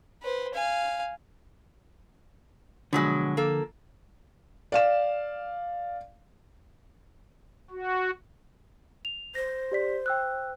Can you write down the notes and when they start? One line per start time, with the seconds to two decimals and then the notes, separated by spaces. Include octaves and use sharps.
0.22 B4 C5
0.54 F5 G#5
2.93 B2 D3 F3 F#3 G#3
3.37 A#3 A4
4.72 D5 F5 E7
7.70 F#4
9.05 F7
9.35 C5 A#6
9.72 G4 D5 B6
10.06 G5 E6 F#6